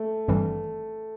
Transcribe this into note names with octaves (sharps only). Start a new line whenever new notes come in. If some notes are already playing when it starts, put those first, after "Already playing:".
Already playing: A3
G#1 G2 E3 G3 C4